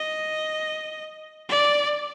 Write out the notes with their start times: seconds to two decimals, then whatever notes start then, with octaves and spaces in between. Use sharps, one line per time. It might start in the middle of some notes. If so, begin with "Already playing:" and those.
Already playing: D#5
1.49 D5